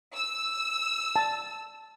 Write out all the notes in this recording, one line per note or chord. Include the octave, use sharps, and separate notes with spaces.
E6
A5